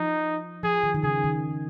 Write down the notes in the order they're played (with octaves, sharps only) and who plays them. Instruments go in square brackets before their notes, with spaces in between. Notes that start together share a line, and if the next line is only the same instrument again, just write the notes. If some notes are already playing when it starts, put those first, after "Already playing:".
Already playing: [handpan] F3 [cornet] D#4
[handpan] F3 [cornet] G#4
[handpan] D#3
D#3
[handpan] C#3 [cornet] G#4
[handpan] D#3